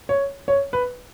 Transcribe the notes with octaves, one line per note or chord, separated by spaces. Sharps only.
C#5
C#5
B4